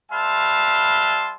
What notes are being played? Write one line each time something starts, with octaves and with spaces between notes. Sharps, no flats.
G3 B4 E5 F5 A5 C6